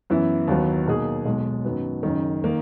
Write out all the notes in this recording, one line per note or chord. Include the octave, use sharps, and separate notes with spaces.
F#2 E3 B3 E4
D#2 D#3 F#3 B3
B2 A#3 D#4 G#4
B1 B2 G#3
F#2 D#3 F#3 B3
F#1 F#2 D#3
D#3 A#3